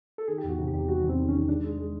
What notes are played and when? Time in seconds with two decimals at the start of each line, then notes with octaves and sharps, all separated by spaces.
0.18 A4
0.28 D#3 G#4
0.38 G4
0.43 E2
0.49 F#4
0.59 C3
0.68 G4
0.74 E2
0.88 G3 F#4
1.03 E2
1.09 C4
1.18 D#3
1.29 C#4
1.34 D#3
1.48 G#3 D4
1.63 G#3
1.78 G#3